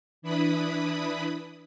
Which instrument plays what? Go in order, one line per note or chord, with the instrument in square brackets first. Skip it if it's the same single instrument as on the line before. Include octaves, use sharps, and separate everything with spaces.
[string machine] E3 D4 E4 B4 B5 D#6